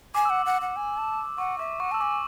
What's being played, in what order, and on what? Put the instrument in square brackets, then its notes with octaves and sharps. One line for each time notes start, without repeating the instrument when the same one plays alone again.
[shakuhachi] G#5 [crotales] D6
[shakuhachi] F#5 [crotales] E6
[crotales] D6
[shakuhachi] F#5
F#5
G#5
A5
[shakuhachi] F#5 [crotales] C#6
[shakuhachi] E5 [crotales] D6
[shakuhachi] F#5 [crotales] C#6
[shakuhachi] A5 [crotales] E6
[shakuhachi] G#5 [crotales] D6